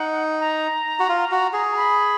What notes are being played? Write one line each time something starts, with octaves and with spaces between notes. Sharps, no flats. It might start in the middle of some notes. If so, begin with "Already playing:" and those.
Already playing: D#4 F#5
A#5
F#4
F4
F#4
G#4
A#5
B5